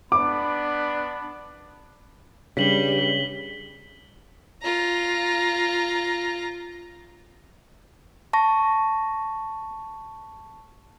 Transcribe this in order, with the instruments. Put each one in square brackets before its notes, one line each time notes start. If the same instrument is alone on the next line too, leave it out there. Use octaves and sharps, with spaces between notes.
[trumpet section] B3 D4 B5 [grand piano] D6
[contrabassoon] G2 [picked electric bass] C#3 [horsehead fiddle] G3 [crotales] B6 F#7 G7
[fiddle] F4 A#5
[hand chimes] A5 C#6 A#6